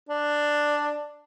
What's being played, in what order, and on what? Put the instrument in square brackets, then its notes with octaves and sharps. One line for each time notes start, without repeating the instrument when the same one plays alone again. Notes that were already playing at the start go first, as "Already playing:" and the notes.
[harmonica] D4